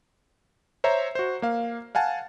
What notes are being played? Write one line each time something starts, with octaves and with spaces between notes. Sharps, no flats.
C5 C#5 E5 A#5
F#4 C5
A#3 F5
F5 F#5 G#5 A5